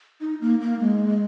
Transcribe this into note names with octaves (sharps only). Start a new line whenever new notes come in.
D#4
A#3
A#3
G#3